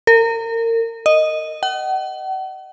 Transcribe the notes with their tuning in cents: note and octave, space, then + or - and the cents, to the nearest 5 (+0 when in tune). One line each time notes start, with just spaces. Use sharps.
A#4 -30
D#5 -5
F#5 +40